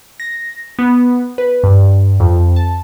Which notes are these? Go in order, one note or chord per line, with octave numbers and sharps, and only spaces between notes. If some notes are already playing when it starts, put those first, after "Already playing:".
A#6
B3
B4
G2
F2
A5